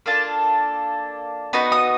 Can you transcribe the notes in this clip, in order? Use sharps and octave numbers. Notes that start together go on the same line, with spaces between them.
A#3 D4 F4 A4 A5
B3 D#4 F#4 B5
D#6